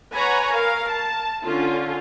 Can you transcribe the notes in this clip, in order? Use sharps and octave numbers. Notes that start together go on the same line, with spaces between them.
B4 C#5 F#5 G#5 A#5 B5
A#4 F5
A5
D3 C#4 F4